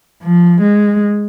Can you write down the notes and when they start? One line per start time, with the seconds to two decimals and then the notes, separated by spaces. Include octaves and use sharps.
0.23 F3
0.61 G#3